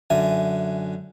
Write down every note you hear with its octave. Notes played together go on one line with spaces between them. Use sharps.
F#2 D3 E5 G#5